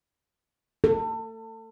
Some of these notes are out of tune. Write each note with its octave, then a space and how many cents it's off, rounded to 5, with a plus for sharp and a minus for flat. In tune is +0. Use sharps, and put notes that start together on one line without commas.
A4 +30